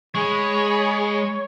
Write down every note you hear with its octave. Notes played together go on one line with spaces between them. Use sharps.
G#3 G#4 C#5 B5